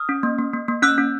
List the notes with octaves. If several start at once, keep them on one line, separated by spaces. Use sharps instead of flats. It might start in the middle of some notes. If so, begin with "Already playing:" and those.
Already playing: D#6 F6
C#4
A#3
A#3
A#3
A#3
C#4 E6 F#6
C#4